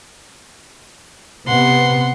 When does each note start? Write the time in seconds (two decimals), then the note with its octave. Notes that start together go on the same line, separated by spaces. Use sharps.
1.47 C3 B3 F#5 C6